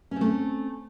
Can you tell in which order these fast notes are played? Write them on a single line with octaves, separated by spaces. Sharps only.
C#4 C4 A3